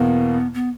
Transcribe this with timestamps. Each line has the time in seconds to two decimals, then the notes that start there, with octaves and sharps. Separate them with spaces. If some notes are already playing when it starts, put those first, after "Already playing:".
Already playing: E2 B2 A#3 B3
0.54 B3